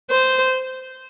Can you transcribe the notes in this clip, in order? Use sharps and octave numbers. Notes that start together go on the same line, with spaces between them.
C5